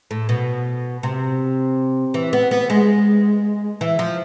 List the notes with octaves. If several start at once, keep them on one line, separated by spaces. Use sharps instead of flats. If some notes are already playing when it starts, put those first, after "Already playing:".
A2
B2
C3
E3
B3
B3
G#3
E3
F3